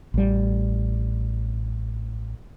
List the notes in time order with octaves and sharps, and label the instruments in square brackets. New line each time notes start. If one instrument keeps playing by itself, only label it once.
[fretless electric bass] A1 G3